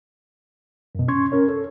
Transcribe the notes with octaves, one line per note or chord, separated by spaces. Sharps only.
F#2 B2
C#4 C6 C#6 G#6
C#4 A#4 C#5
A4